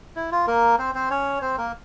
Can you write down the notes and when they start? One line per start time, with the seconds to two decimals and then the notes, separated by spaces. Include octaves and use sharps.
0.16 E4
0.32 F4
0.47 A#3 A#4
0.79 C4 C5
0.94 C4 C5
1.10 C#4 C#5
1.42 C4 C5
1.58 A#3 A#4